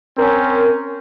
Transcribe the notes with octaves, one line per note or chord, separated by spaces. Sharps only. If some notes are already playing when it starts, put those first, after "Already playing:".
C4 C#4 A#4